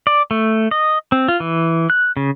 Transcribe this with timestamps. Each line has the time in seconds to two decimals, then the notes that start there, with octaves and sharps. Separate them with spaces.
0.07 D5
0.31 A3
0.71 D#5
1.12 C4
1.28 F4
1.40 E3
1.90 F#6
2.17 C#3